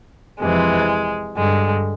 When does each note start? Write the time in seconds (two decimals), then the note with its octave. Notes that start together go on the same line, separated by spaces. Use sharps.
0.40 F2 C3 E3 G#3
1.37 G2 D3 G#3